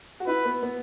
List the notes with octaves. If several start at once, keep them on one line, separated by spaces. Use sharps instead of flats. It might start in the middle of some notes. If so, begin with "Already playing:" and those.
F#4
E4 B4
B3
B3